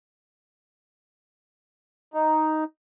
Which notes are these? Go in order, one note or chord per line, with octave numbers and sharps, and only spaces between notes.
D#4